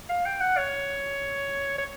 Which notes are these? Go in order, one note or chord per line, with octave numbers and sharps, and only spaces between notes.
F5
G5
F#5
C#5
C#5